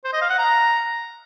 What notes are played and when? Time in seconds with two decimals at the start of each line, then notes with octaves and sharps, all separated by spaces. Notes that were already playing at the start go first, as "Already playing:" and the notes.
0.05 C5
0.13 D#5
0.22 F5
0.30 F#5
0.39 A#5